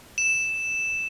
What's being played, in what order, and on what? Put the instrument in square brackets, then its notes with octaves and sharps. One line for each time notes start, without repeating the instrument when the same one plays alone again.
[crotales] E7